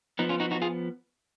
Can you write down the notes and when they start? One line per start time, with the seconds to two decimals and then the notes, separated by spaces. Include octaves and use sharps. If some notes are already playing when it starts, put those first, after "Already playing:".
0.19 F3 B3 D#4
0.29 C#4 F4
0.40 D#4 F#4
0.51 D#4 F#4
0.62 F4 G#4